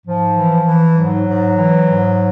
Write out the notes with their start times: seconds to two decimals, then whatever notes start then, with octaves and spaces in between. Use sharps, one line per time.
0.06 G#2 F3
0.37 E3
0.66 E3
0.97 G#2 F#3
1.27 G#2
1.57 E3
1.87 G#2